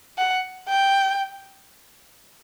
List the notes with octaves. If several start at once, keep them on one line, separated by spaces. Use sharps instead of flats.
F#5
G5